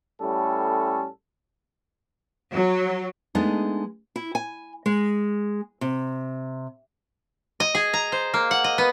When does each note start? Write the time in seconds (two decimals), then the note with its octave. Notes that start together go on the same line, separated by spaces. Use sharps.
0.22 A2 G3 C#4 A4
2.51 F#3
3.35 G#3 A3 B3 D4 D#4
4.16 E4
4.35 G#5
4.86 G#3
5.81 C3
7.60 D#5
7.75 G#4
7.93 A#5
8.12 C5
8.34 A#3
8.51 F#5
8.64 D#5
8.78 B3